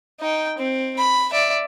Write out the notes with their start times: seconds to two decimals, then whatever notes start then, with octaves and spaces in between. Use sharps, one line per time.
0.20 D#4 G5
0.58 C4
0.98 B5
1.33 D5 E5